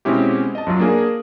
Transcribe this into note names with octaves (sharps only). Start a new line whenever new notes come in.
B2 G#3 C4 C#4 E4 G4
D#5 A5
F#2 F#3 F4
A#3 D4 G#4 A#4